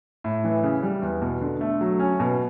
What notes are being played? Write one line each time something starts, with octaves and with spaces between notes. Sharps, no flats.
A2
E3
C#3
G3
E2
B2
D3
A3
F#3
C#4
B2